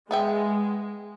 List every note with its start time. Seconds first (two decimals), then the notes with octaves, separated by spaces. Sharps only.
0.11 G#3 B3 E5 G5